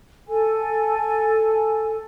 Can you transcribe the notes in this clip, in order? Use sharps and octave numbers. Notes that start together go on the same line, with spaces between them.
A4 G#5